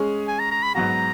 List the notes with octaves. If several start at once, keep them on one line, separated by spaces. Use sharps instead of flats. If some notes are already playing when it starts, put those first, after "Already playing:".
Already playing: G#3 C#4 G#4
G#5
A#5
A#5
B5
G#2 F#3 B3 F#4 A#5